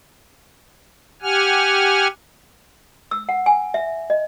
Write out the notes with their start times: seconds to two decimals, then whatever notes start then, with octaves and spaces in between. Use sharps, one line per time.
1.22 G4 F#5 G#5 F6
3.11 E6
3.29 F#5
3.46 G#5
3.74 E5
4.10 D#5